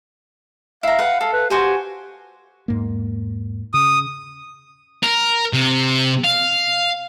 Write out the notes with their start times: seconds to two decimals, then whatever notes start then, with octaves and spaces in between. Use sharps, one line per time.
0.83 E4 F5 A#5
0.99 B4 F#5
1.21 A4 F5
1.33 B4
1.50 F#4 G4 C5 G#5
2.68 E2 G#2 A#3
3.74 C#3 D#6
5.03 A#4
5.53 C3
6.24 F5